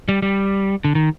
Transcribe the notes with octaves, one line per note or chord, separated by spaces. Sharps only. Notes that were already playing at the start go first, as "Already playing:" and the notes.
G3
G3
D3
D#3